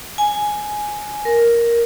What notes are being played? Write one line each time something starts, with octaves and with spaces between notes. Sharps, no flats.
G#5
A#4